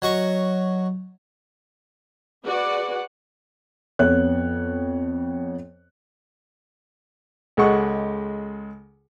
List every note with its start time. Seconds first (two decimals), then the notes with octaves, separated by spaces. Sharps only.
0.02 F#3 D#5 C#6
2.44 F#4 G#4 B4 D5 F#5
3.99 F2 B3 C#5 F#6
7.57 C#2 G#3 A4 F#5 C#6